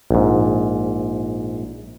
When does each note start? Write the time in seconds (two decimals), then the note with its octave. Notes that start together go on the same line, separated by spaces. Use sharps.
0.11 A#1 G#2